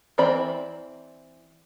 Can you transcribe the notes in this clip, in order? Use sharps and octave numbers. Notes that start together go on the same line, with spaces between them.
E3 C4 D5 B5